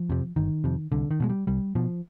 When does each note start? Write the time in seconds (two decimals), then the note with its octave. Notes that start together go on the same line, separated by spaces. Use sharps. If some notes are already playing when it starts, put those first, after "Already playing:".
Already playing: F3
0.10 F2 C3
0.36 G1 D#3
0.64 F2 C3
0.92 C2 D3
1.11 D#3
1.20 B2 G#3
1.29 G3
1.47 C2 G3
1.75 B2 F3